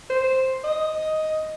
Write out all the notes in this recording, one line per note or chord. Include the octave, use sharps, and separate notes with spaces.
C5
D#5